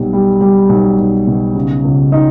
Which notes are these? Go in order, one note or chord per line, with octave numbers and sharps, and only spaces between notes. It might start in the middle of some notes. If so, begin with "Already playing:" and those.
Already playing: B1 B2 G3
G3
G3
B1
B1
B2
C#3
C#2
D#4